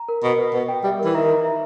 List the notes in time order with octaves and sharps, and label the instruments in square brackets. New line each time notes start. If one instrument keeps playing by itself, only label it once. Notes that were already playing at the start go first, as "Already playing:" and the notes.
Already playing: [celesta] A#5
A#4
[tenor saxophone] B2 [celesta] B5
[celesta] B4
[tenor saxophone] B2 [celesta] B4
[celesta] G5
[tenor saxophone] G3 [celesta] E5
[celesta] A#4
[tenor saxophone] E3
[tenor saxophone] D#3 [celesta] E5
[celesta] A#5
E5